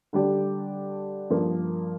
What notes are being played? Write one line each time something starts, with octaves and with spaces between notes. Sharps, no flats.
D3 G3 D4 G4 D5
G2 F3 A#3